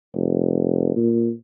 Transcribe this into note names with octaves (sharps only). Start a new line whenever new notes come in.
F1
A#2